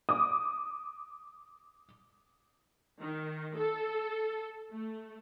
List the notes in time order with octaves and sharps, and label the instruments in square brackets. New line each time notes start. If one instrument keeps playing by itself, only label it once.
[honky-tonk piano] D6 D#6
[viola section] D#3
A4
A3